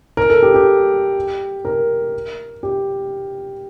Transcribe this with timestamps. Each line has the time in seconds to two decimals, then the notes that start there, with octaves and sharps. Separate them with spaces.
0.17 A#4
0.30 A4
0.42 G4
0.54 G4
1.65 A#4
2.63 G4